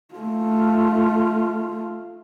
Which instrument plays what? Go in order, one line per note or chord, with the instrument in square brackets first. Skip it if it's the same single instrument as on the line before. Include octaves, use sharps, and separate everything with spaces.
[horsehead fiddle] A3 F4